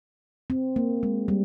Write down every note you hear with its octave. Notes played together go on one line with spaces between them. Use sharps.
C4
A#3
G#3
G3